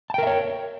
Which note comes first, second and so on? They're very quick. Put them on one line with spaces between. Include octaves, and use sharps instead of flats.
A5 G5 A#4 E5 C#5